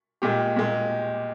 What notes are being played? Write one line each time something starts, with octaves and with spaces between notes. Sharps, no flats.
A#2 G#3 G4
A#2 G#3